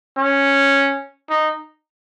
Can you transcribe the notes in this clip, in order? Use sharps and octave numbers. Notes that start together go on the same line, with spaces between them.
C#4
D#4